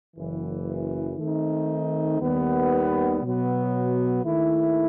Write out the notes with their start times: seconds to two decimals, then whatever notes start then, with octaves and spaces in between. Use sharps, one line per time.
0.16 F#1 F#2 E3
1.18 D#3 A3 C4 D#4
2.20 D#2 D#3 G3 B3
3.23 B2 F#3 B3
4.25 D#2 D#3 A3 E4